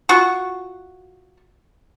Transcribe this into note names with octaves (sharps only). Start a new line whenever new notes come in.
F4 F#4 F#5 C#6